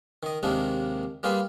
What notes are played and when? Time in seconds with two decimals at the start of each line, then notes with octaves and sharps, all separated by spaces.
0.23 D#3 D#5
0.43 D#2 C3 D#3 G#3 A#3 D4
1.23 G3 A#3 F4 G#4 B4